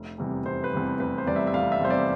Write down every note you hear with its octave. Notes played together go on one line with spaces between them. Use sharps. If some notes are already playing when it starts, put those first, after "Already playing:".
Already playing: F1
E2 C3 G3
F1 C5
B4
E2 C3 G3
F1 B4
C5
E2 C3 G3 D5
E5
E5
F1 F5
E5
E2 C3 G3 C5
D5